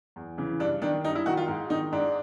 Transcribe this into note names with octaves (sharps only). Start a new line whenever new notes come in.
E2
C#3 E3
G2 D4
D#3 D4
G2 D#4
E4
D#3 F#4
F4
G#2
D#3 D#4
G#2 D4